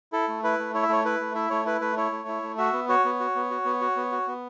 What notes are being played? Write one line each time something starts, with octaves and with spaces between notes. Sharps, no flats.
E4 A4
A3
E4 B4
A3
E4 C#5
E5
A3 C#5
E4 B4
A3
E4 E5
A3 C#5
E4 B4
A3 B4
E4 C#5
A3
E4
A3
F#4 E5
B3
F#4 C#5
B3
F#4
B3
F#4
B3
F#4
B3
F#4
B3